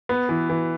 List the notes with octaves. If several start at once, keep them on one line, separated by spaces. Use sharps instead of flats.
B3
E3
E3